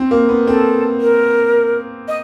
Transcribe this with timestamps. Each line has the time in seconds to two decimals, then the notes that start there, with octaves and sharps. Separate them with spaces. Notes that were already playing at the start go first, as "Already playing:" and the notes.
Already playing: C4
0.11 A#3
0.29 B3
0.46 C4 A4
1.01 A#4
2.08 D#5